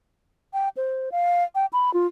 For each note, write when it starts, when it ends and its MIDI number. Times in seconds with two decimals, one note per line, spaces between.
0.53 0.69 79
0.77 1.09 72
1.12 1.44 77
1.55 1.66 79
1.73 1.93 83
1.94 2.07 65